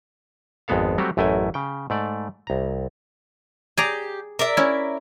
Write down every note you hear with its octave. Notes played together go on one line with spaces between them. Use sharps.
G#1 F2 G#3 B3 A4 F5
F#3 G3 A3 C4 F#4 G4
A1 F#2 A3 E4 G5 G#5
C#3 G5
G#2 A3 D5
C2 A#5
G4 G#4 D5 A#5
A#4 D5 E5
C#4 E4